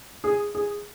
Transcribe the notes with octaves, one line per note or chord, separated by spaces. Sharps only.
G#4
G#4